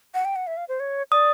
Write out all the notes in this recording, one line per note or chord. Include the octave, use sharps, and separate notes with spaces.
F#5
G5
F#5
E5
F5
C5
C#5
D5 D#6